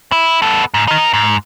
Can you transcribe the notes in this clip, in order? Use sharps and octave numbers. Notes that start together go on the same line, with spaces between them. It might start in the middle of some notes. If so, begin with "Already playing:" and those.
E4
B3 A4
G#2
D#4 A#4
G#2